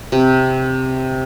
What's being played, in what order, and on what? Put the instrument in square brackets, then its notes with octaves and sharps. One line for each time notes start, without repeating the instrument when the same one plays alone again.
[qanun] C3